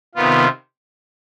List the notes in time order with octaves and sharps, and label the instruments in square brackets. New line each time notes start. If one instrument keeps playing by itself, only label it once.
[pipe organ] C3 D#3 B3 F4